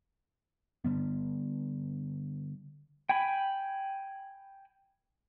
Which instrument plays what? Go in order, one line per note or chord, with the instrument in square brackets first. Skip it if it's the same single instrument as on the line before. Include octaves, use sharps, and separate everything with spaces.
[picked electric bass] D3 G3 B3
[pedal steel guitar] G5 G#5 B5